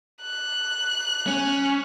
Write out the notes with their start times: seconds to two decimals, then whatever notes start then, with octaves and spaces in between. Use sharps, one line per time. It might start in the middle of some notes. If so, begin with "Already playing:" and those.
0.22 F#6
1.27 C#4